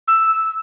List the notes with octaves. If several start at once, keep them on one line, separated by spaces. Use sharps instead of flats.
E6